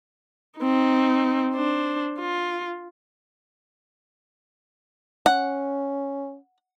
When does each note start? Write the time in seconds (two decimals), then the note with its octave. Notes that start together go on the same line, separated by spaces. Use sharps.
0.59 C4 D#4
1.53 D4 C5
2.19 F4
5.26 C#4 F#5